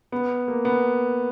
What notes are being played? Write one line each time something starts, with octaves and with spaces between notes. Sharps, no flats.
B3
A#3
B3